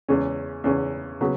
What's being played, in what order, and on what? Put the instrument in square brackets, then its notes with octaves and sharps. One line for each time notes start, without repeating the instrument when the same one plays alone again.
[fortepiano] E2 C#3 G#3 C#4
E2 C#3 G#3 C#4
C#3 F#3 B3